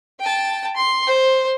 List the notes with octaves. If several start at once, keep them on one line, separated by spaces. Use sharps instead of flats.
G5 A5
C6
C5